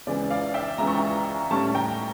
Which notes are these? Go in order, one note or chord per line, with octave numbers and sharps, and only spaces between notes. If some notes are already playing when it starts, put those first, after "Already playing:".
C#2 C#3 E3 D5
D5 F5
E5 G5
C#2 C#3 E3 A#5
C#6
G5 A#5
A2 G3 C#4 A5 C#6
G5 A#5